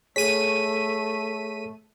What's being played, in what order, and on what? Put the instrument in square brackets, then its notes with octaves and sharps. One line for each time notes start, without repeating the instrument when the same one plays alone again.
[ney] A3 [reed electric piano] G#4 C#5 [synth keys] B6 D#7